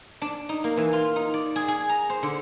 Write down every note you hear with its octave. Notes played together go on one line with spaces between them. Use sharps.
D4
D#4
A#3
E3
F4
D#4
D5
G#4
G#4
A#5
C5
D3